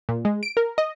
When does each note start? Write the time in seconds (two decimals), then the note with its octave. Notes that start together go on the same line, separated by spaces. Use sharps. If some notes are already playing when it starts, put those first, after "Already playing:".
0.09 A#2
0.25 G#3
0.43 D7
0.57 A#4
0.78 D#5